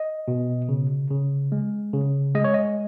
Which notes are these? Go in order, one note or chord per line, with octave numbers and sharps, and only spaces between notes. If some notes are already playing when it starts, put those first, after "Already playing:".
Already playing: D#5
B2
C#3
C#3
G#3
C#3
G#3 D#5
C#5
D#5